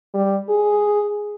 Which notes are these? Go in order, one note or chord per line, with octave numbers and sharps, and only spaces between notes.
G3
G#4